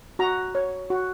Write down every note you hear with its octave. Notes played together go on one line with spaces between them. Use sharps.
F#4 A#5
C#5
F#4